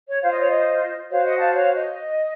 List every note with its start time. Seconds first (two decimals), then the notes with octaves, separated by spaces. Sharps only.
0.08 C#5
0.22 F4 C5 F5
0.31 D#5
0.40 C#5
0.49 D#5
1.09 F#4 C5 C#5 F5
1.24 D#5 F#5
1.39 F5 A5
1.53 C#5 F5
1.75 D#5